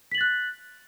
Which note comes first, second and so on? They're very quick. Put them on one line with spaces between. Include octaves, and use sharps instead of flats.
B6 F#7 A6 F#6